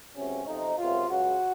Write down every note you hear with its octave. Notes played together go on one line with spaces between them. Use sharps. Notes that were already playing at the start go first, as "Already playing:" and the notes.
C#2 C3 F#3 C#4
F2 C3 F3 D#4
C#2 C3 F#3 A#3 F4
C#2 C#3 F#3 F#4